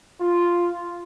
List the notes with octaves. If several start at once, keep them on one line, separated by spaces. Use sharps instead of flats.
F4